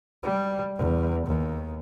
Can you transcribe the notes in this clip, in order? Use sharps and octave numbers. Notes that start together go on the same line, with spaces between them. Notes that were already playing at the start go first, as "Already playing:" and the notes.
G3
E2
D#2